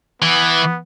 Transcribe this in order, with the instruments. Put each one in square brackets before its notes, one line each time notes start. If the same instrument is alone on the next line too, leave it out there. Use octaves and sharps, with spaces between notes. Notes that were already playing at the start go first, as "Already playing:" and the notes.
[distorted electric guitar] E3 [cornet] B3